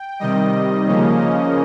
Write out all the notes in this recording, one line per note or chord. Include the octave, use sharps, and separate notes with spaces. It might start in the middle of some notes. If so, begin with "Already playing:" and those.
Already playing: G5
C3 D#3 G3 D#5
C#3 F3 A#3 C#4